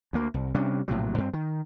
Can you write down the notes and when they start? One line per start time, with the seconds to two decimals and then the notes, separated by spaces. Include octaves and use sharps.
0.13 D2 A#3
0.34 C2
0.55 C3 G3 C#4 D4
0.88 A#1 A2 C3 F#3
1.18 G2 C4
1.33 D#3